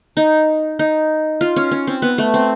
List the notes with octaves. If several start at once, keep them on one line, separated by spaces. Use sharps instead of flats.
D#4
D#4
F4
C#4
C#4
C4
B3
A3
C4